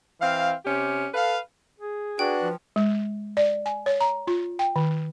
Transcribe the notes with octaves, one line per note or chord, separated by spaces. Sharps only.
E3 C4 F5
C3 C#4 G4
A4 B4 F5
G#4
D4 F#4 B4 G5 F#6
F3
G#3
D5
G#5
C#5
A#5
F4
G5
D#3